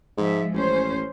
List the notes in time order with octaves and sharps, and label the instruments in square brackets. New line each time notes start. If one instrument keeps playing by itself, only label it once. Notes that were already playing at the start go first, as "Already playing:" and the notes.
[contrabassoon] G#2 [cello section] F3 G#3 E5
[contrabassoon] A1 [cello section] C#4 C5